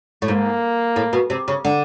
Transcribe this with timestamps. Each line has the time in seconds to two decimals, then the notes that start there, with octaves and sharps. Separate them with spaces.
0.22 A2
0.28 G#2 A#3
0.96 A2
1.13 B2
1.30 C3
1.48 C#3
1.65 D3